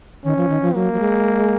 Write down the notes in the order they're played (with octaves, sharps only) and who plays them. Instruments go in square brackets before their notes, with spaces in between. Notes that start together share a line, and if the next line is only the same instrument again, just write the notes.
[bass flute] D#3 [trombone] C#4
[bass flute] F3
D#3
F3
[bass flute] F#3 [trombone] A#3
[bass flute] F#3
G#3